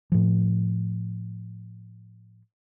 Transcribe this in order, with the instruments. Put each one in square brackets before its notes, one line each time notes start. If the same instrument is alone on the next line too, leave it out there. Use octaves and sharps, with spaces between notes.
[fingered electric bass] A2 F3